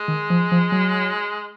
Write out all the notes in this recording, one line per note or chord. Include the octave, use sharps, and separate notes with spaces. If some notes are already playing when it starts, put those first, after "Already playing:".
Already playing: G#3
D#3
F3
F3
F#3